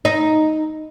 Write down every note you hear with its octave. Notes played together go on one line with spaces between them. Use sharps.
D#4